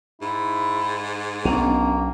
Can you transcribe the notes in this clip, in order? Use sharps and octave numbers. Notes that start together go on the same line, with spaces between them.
G#2 E4
B1 A#3 B3 C#4 D4